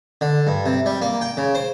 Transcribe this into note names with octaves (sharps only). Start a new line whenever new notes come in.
D3
G2
C3
G3
A#3
G5
C#3
C5